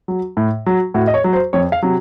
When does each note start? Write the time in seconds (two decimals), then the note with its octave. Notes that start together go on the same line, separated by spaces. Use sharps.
0.08 F#3
0.37 A2
0.66 F#3
0.94 A2 F#4
1.07 D#5
1.14 C#5
1.24 F#3
1.33 C5
1.53 F2 C#5
1.72 F5
1.82 C3 F#3